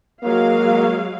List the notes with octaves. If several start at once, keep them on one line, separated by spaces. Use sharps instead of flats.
F#3 G#3 A#3 F5